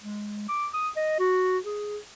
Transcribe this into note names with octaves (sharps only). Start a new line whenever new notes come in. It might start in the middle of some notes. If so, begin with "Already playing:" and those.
G#3
D6
D#6
D#5
F#4
G#4